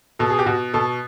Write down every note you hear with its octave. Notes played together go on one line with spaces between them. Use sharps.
B2 A4
G#4
G4
B2 F#4
B2 A4